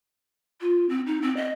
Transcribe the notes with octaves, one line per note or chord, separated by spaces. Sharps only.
F4
C4
D#4
C4
D#5